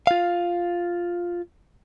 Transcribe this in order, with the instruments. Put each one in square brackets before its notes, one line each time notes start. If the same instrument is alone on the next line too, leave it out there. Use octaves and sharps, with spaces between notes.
[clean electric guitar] F4 F5